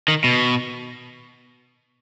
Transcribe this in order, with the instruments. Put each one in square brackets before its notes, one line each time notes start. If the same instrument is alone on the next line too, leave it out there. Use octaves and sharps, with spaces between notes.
[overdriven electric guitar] D#3
B2